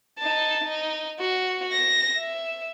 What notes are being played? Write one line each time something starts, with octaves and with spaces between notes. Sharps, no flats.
D#4 A5
D#4
F#4
A#6
E5